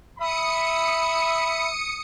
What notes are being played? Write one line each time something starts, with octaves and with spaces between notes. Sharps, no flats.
E5 B5 D#6 C#7